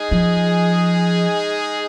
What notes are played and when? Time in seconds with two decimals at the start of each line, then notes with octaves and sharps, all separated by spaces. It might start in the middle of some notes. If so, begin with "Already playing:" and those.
Already playing: G#3 D#4 G#4
0.11 F3